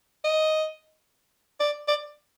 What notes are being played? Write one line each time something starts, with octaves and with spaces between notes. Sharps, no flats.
D#5
D5
D5